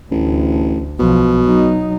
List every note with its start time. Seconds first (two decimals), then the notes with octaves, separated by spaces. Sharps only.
0.11 A1 D2
0.99 B1 B2 F3
1.45 F#3 D#4